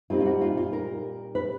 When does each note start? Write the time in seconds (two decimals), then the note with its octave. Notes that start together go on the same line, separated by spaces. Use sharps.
0.10 A#2 G3 C4 D#4 F4
0.20 F4
0.26 F#4
0.41 F4
0.57 F4
0.73 A#4
1.35 B4